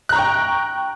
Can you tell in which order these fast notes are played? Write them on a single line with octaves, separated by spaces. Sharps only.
F#6 A#5 C#6 G5